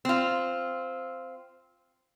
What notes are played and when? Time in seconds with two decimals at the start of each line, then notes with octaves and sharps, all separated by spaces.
0.05 C4 F4